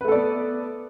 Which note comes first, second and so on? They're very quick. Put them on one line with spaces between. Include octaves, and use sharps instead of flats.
B4 A3 A4 D5 B3